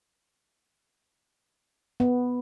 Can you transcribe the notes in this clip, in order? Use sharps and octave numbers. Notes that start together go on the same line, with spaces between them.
B3